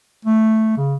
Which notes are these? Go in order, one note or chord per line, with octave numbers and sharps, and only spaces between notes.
A3
C#3